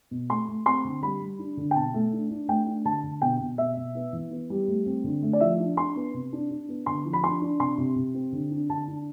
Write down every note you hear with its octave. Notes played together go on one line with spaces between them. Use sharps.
B2
A3 C6
A3
C4 C6
D3
G3 B5
G3
D4
D3
G5
B2 A5
A3
D4
D4
A3 G5
D4
D3 A5
D3
B2 G5
B2
B2 E5
B2
B3
E3
B3
G3
A3
C4
D3
A3
D5
F3 E5
D4
D4 C6
B3
C3
D4
D4
B3
D3 C6
F3
B5
D4 C6
D4
C3 C6
C3
C3
C4
D3
D4
D3 A5
D4